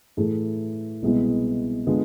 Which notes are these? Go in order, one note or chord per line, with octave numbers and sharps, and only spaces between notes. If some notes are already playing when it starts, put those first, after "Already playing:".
A2 E3 A3 E4 G#4
C2 B2 G#3 B3 E4
D3 G#3 B3 F4